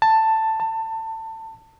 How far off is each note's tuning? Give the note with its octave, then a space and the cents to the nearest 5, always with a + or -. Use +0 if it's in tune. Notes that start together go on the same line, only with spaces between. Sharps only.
A5 +10
A5 +25